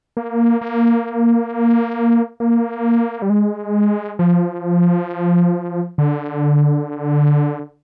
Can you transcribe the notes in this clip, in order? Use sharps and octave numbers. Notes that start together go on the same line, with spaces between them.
A#3
A#3
A#3
G3
G#3
F3
D3